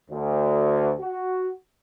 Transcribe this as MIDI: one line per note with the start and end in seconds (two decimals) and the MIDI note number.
0.10 0.94 38
1.00 1.51 66